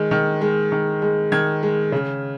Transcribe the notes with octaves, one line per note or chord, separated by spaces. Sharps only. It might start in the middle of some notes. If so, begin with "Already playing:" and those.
Already playing: D#3 G#3
D#3
G#3
D#3
G#3
D#3 G#6
G#3
C#3